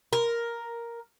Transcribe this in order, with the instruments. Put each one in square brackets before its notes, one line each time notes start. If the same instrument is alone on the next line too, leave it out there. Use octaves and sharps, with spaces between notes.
[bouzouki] A#4